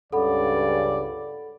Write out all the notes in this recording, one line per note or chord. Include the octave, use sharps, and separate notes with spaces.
C#2 G2 C#3 A4 D5 F#5 B5